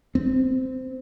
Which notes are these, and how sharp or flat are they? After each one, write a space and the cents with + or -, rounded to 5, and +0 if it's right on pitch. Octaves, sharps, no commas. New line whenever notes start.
C4 -15